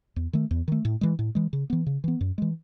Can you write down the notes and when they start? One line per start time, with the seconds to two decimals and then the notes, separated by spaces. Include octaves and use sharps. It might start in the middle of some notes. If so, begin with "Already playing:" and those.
0.16 E2
0.33 D#3 A3
0.51 E2
0.68 D#3 A3
0.85 A2
1.01 E3 G#3
1.19 A2
1.35 E3 G#3
1.53 C#3
1.70 E3 B3
1.87 C#3
2.04 E3 B3
2.21 F#2
2.38 E3 G#3